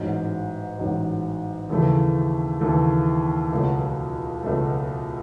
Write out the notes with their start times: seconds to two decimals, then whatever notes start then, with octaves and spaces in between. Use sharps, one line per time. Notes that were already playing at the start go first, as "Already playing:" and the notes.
Already playing: A1 G#2 F#3
0.78 A1 G#2 F#3
1.69 D#2 C#3 E3 A3
2.60 D#2 C#3 E3 A3
3.52 C#2 B2 F#3 A3
4.43 C#2 B2 F#3 A3